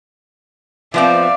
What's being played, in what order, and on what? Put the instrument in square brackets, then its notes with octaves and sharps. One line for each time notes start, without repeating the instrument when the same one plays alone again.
[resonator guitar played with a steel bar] F3 B3 C4 [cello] D5 [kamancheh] E5 F5